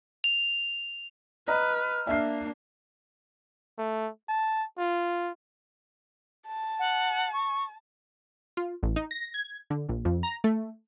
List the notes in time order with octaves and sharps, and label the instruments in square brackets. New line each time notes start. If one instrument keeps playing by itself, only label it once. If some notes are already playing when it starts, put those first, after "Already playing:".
[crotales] F7
[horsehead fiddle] B4 [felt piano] D#5 A#5 [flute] F6
[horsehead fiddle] A#3 D4 [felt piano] E5 C7
[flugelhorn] A3
A5
F4
[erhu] A5
[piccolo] F#5
C#6
[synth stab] F4
A1
D#4
A#6
G#6
D3
A#1
F2
A#5
A3